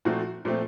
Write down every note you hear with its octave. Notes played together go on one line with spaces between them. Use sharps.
A#2 F3 A3 C4 F#4
A#2 F3 A3 C4